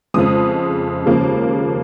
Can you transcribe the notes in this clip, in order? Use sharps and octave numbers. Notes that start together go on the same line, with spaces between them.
F2 C#3 F3 G#3 D#6
D#2 C#3 F3 A#3